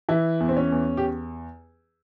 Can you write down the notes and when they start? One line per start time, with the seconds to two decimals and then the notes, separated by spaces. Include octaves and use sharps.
0.09 E3 E4
0.40 E2
0.49 C4
0.57 C#4
0.72 E2
0.97 G4